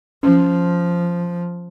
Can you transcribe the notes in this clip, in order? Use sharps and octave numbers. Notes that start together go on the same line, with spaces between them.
F3 C#4